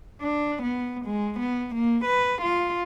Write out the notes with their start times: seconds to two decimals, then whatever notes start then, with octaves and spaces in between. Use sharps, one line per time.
0.21 D4
0.63 B3
1.06 G#3
1.39 B3
1.75 A#3
2.05 B4
2.42 F4